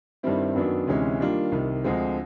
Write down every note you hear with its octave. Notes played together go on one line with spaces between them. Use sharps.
G2 D#3 G3 C4 E4
F#2 D#3 F#3 B3 D4
D2 C3 E3 G#3 C#4
D#3 G3 A#3 D4 F4
C2 C3 D#3
D2 D3 F3 G#3 C4